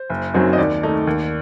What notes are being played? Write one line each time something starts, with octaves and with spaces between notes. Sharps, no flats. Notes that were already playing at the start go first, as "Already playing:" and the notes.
Already playing: C5
F#1
F#2 F#3 C4 D#4
D#5
D#2 D5
D#3 A3 D#4
D#2